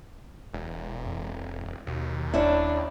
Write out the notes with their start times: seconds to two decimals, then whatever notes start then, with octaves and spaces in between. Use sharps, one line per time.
0.53 E1
1.06 F2
1.87 D#2 B2
2.34 D#1 C#4 D4 E4